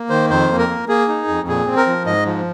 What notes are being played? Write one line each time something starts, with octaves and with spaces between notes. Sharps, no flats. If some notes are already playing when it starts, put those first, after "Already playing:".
Already playing: A#3
D#3 C5
F2 C5
A#3
A#4
A#3
A#3 G#4
D#4
F2
A#2 G#4
C4
A#4
F3
G#2 D#5
F3